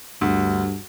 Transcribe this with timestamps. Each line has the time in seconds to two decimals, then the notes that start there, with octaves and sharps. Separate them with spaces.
0.21 D2 G2